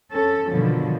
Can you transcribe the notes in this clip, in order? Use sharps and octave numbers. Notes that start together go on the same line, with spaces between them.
C#4 A4
G2 B2 D3 D#3 F3 F#3